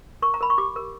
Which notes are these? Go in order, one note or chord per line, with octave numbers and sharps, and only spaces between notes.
A#4 C#6
A#5
A#4 B5
C#6
G4 D6
A#4